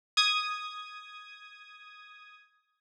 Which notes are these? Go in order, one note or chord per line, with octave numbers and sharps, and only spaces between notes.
D#6 G#6